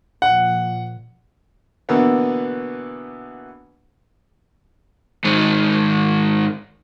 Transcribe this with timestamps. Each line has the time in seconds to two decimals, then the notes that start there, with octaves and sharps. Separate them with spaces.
0.22 A#2 F3 F#5
1.89 B2 D3 E3 A#3 B3
5.25 G#2 D#3